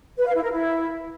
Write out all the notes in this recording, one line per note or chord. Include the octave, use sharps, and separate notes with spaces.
B4
F5
E4
A#4
E4